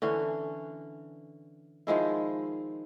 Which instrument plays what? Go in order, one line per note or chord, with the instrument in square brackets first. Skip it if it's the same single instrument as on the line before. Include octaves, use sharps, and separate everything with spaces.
[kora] D3 E3 C#4
D#3 F3 G#3 E4